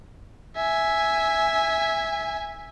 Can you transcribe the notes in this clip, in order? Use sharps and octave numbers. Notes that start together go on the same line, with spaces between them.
E5 G#5